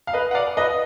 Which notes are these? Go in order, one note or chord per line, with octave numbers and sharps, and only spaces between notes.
F5
B4 D#5
F#5
D5 F5
B4 D#5